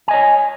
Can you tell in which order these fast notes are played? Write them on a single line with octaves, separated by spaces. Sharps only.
G#5 D#5 C#5